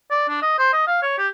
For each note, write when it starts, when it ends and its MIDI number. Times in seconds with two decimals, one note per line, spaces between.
0.11 0.25 74
0.29 0.39 62
0.42 0.58 75
0.58 0.70 72
0.73 0.87 75
0.87 0.97 77
1.02 1.15 73
1.18 1.27 67